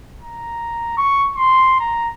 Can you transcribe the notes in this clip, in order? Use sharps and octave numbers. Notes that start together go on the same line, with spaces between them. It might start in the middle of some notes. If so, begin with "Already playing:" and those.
A#5
C#6
C6
A#5